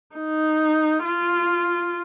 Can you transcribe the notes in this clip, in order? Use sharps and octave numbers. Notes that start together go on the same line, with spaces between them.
D#4
F4